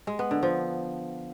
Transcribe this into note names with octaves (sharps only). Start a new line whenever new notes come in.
G#3
B3
D3
F3